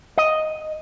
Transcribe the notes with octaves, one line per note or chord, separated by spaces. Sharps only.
D#5